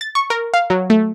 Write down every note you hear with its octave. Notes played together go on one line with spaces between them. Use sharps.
A6
C#6
A#4
F5
F#3
A3